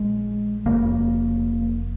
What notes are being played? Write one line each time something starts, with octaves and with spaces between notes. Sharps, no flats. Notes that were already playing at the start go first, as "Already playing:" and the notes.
Already playing: A#1 G#3
F1 F2 C#3 A#3